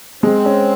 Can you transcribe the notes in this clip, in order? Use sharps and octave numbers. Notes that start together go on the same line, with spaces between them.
G#3 C4
C#4